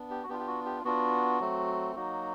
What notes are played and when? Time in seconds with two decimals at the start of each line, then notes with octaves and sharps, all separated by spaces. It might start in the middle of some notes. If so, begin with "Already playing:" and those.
Already playing: B3 D4
0.11 G4
0.23 F#4
0.29 B3 D4 F4 G4
0.39 G4
0.47 F#4
0.65 G4
0.84 B3 D4 F4 F#4
1.40 F#3 A3 C4
1.96 F#3 A#3 D#4 F#4